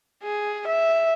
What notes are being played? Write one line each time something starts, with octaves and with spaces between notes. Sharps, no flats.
G#4
E5